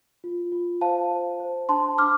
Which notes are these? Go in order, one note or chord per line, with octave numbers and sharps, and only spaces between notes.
F4
F4
C5 F5 A5
C5
C5
D4 A5 C6
D4 D6 F6